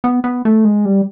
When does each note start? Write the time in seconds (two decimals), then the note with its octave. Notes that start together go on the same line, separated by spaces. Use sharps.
0.04 B3
0.24 B3
0.45 A3
0.65 G#3
0.85 G3